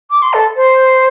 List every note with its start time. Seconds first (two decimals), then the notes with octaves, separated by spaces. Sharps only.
0.11 D6
0.22 C6
0.34 A4
0.56 C5